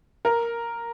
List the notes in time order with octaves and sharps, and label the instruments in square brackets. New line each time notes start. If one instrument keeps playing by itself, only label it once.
[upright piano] A#4